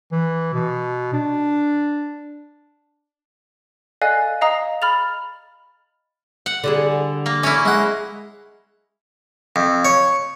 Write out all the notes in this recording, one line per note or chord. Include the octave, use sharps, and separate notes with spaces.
E3
B2
D4
A4 D5 D#5 F5 G#5 F#6
D#5 F5 A#5 D#6
B5 F6 A6 F7
F#5
D3 G3 G#4
A#3
C#4 E4 D5
G#3 F#5
F2
C#5